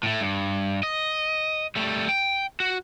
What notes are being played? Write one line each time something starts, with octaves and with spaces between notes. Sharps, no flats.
A2 A3
G2
D#5
G3 A3
G5
F#4